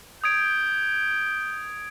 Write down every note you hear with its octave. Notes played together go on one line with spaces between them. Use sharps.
D#6 G6 G#6 D7